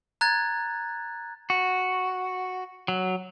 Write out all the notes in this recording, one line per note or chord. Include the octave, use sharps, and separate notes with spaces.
A#5 F#6 G#6 A6
F#4
F#3